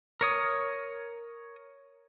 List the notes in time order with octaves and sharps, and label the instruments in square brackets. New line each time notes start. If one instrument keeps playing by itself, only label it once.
[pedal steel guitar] A#4 C#5 D#6